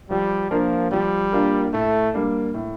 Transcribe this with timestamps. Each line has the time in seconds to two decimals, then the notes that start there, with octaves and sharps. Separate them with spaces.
0.10 F3 G3
0.51 F3 A#3 D4 F4 A#4
0.91 F3 G3
1.32 A#3 D4 F4 A#4
1.73 A2 A3
2.14 G3 A#3 D4
2.54 A2